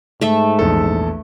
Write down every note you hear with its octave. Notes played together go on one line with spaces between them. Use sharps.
G#2 A3 E5
A#1 E2 A4